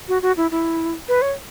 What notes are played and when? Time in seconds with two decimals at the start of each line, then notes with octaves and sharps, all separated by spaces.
0.08 F#4
0.22 F#4
0.37 E4
0.52 E4
1.09 B4
1.22 C#5